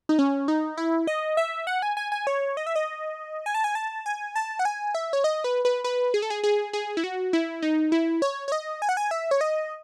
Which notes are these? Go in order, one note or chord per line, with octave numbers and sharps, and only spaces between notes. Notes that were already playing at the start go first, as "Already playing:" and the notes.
D#4
C#4
D#4
E4
D#5
E5
F#5
G#5
G#5
G#5
C#5
D#5
E5
D#5
G#5
A5
G#5
A5
G#5
A5
F#5
G#5
E5
C#5
D#5
B4
B4
B4
G#4
A4
G#4
G#4
G#4
E4
F#4
E4
D#4
E4
C#5
C#5
D#5
G#5
F#5
G#5
E5
C#5
D#5